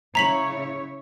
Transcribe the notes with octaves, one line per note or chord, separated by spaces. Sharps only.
C#3 E4 C#5 A#5 B6 F#7